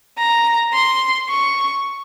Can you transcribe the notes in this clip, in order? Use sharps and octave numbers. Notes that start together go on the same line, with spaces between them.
A#5
C6
C#6